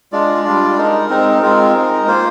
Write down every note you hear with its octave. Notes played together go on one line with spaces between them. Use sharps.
G#3 D4 F4 D5
G3 D4 F4
G#3 D#4 A#4
G#3 C4 D#4
G#3 C4 F4 A#4
G#3 D#4
A#3 F4 C5